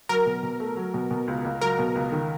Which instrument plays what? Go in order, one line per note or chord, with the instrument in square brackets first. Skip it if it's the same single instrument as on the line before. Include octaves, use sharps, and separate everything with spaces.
[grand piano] F#3 [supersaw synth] A#4
[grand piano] B2
B2
A3
F#3
B2
B2
C#2
C#2
[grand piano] F#3 [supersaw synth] A#4
[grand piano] B2
C#2
D#3